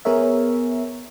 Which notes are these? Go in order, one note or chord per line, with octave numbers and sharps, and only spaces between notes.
B3 G#4 A#4 C#5 E5